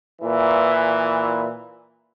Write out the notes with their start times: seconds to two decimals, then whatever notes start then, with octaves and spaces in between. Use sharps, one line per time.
0.21 A#2 E3